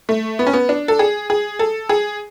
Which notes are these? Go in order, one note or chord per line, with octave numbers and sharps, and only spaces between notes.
A3
B3
C#4
B3
D4
A4
G#4
G#4
A4
G#4